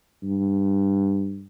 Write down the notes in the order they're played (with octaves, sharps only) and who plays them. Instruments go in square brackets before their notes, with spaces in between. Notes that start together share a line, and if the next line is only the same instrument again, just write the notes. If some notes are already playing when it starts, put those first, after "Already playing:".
[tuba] G2